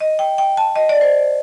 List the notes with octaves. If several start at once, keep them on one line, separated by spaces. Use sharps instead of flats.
D#5
G5
G5
A5
D#5
D5
C5